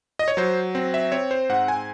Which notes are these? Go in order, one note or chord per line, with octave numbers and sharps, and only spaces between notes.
D#5
C#5
F#3 C5
C4
E5
C4 C#5
C5
G#2 F#5
G#5